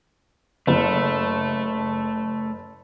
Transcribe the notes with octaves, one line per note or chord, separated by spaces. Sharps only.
F#1 A3